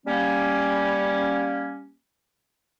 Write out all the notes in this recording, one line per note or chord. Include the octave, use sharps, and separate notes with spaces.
G3 A#3 C#4